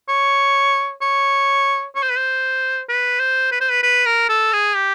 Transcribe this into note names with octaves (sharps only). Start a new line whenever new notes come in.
C#5
C#5
C#5
C5
B4
C5
B4
C5
B4
C5
B4
B4
A#4
A4
G#4
G4